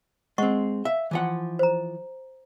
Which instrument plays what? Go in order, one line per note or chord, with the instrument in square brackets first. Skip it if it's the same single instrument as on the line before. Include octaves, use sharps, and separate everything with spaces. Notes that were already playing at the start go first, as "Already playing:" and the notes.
[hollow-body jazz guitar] G#3 C4 [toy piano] D#5 F#5 C#6
[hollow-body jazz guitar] E5 [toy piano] F5
[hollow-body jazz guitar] E3 F3 F#5
[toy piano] C5 A#5